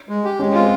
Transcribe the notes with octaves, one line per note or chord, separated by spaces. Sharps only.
G#3
G4
G#3 C#4
C4 F4